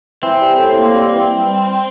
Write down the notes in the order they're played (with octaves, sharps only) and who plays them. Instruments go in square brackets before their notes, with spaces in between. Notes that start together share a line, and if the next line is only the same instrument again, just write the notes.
[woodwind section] E3 [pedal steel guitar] C4
[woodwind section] G3
A2
A#3
G3
E3
G3